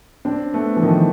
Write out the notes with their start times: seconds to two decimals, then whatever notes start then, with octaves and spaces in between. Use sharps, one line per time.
0.25 C4 D4
0.54 A3 B3
0.76 E3
0.83 D#3 F3